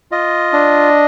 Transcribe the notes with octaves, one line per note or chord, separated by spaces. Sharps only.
F4 D#5
D4